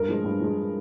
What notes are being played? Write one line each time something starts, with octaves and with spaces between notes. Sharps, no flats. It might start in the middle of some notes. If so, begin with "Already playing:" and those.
Already playing: G2 A#4
F3 G#3
G2
F3 G#3